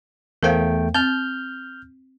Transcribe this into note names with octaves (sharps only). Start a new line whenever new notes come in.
E2 A3 A#4 C5 F5 G5
C4 F6 G6